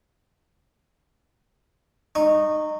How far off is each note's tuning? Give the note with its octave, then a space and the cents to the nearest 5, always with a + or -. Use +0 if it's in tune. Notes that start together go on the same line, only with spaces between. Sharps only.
D#4 -20 C#6 -10